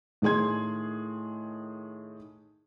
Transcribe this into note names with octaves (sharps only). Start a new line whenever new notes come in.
A2 D#3 G#4 C6 G#6